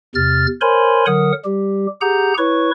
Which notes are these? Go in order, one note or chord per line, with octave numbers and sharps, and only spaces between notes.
E2 C3 F6 A6
A#4 C5 C#5 G#5 B5 C6
D3 F#3 A#4 F#5 D#6
G3 G4
G4 G#4 F#5 A#5 G6
E4 B4 C#5 C#6